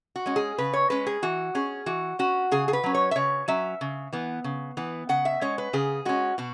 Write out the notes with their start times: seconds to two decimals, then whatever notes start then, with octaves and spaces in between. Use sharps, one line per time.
0.16 F#4
0.26 G#3 C#4
0.36 G#4
0.58 C#3 B4
0.73 C#5
0.90 G#3 C#4 B4
1.07 G#4
1.23 E3 F#4
1.55 C#4 G#4
1.86 E3 F#4
2.19 C#4 F#4
2.51 C#3 G#4
2.68 G#4
2.73 B4
2.84 F#3 C#4
2.95 C#5
3.11 E5
3.16 C#3 C#5
3.48 F#3 C#4 E5
3.81 C#3
4.13 E3 B3
4.44 C#3
4.77 E3 B3
5.09 C#3 F#5
5.25 E5
5.41 G#3 C#4 C#5
5.58 B4
5.73 C#3 G#4
6.05 G#3 C#4 F#4
6.38 B2 F#4